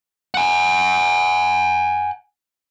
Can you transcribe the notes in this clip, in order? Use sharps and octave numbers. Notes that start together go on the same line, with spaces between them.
F#5 G#5